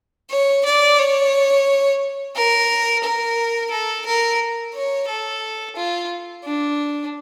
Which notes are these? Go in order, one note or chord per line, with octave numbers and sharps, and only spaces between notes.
C#5
D5
C#5
A#4
A#4
A4
A#4
C#5
A4
F4
D4